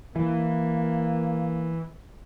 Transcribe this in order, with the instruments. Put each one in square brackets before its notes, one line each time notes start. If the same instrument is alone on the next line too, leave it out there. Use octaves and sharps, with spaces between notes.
[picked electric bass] E3 [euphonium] A#3